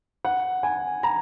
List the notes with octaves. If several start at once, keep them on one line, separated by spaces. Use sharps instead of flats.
F#5
G#5
A#5